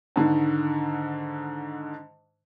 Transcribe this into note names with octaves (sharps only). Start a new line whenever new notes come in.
G#2 D3 D#3